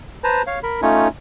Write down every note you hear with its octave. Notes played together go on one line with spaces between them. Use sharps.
B4 C5 A5 A#5
C#5 F5
A#4 B5
A3 C#4 D#4 F4 C#5